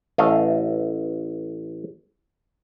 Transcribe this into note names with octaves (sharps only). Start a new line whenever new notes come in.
A1 A3 D#5 F5